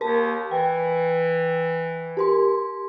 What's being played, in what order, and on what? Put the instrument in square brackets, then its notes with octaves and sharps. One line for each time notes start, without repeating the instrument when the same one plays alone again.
[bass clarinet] D#2 [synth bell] A#4 A5
[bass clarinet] E3 [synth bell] G5
[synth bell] G4 A#4 C6